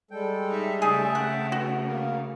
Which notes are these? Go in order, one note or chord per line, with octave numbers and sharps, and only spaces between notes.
G3 G#3 A4 G5
D#4 E5
C#3 A3 G#4 E5 G5 A5
F#5
B3 F#4
A#3 F5